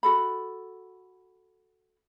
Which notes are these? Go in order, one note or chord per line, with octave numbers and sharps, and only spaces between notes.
F#4 A4 B5